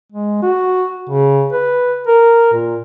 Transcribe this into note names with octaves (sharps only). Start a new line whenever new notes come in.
G#3
F#4
C#3
B4
A#4
A#2